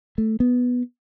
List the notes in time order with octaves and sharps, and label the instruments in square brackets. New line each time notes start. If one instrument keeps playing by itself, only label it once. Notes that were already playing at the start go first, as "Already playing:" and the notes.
[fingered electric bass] A3
B3